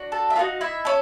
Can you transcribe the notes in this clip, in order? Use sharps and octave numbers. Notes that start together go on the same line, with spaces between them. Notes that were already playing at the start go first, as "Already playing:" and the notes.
Already playing: D4 F#4
A4 A5
E5
A#3 D#4 F4 F#4 F5
E4 E5
C#4 A4